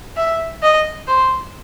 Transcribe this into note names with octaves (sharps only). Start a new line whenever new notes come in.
E5
D#5
C5